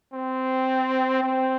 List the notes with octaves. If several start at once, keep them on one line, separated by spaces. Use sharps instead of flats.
C4
C4